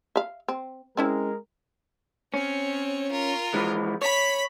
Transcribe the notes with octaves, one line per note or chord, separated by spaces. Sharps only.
E5 F5
C4
G#3 C4 C#4 E4 A#4
C4 C#4 C#5
F4 A#4
E3 F3 G#3
C#5 B5 B6